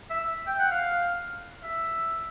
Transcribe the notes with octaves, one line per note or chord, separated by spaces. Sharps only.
E5
G5
F#5
F5
E5